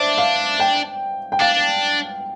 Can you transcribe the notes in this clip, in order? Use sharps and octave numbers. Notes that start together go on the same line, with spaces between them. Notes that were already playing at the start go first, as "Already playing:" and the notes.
Already playing: D4 C5 D5 E5
F5
G5
G5
D4 F5